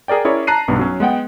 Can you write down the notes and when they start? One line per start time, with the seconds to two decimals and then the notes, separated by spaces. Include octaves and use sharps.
0.08 G#4 A#4 D5 G5
0.25 C#4 E4 G#4 A#4 C#5 D5
0.47 A5 A#5 F#6 C7 D#7
0.68 B1 G2 B3
0.79 F#3 C#4
1.00 G#3 B3 F#5 G5